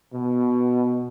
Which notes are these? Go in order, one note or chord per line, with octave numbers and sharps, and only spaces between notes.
B2